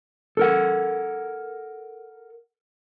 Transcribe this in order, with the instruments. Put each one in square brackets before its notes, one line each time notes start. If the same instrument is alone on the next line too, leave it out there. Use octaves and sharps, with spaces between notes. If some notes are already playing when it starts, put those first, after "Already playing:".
[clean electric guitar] A4 A#4 F#5